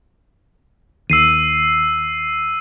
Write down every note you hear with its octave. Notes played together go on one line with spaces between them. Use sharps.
D#2 E6 C7 D#7